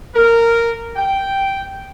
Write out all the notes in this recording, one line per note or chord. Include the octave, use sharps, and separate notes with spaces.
A#4
G5